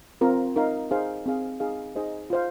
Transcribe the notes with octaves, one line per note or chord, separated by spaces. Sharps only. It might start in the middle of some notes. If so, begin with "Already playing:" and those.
C4 F4 A#4
D#4 A#4 F5
D#4 G#4 C5 F5
C4 G#4 F5
D#4 G#4 F5
D#4 G#4 C5 D#5
F4 C5 F5